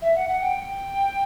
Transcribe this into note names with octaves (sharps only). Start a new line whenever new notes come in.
E5
F#5
F#5
G5